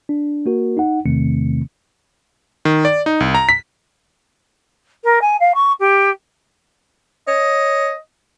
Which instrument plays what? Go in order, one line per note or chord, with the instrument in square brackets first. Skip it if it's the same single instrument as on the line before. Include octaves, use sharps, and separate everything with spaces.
[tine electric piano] D4
A#3 F#4 A#4
D#4 F#5
E2 C3 D#3 A3 C4 C#7
[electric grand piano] D#3
D5
D#4
C2
A#5
B6
[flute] A#4
G#5
F5
C#6
G4
[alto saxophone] C#5 [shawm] D#5